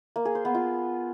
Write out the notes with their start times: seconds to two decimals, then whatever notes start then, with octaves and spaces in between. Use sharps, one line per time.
0.16 A#3
0.25 G#4
0.35 C5
0.45 B3
0.55 F4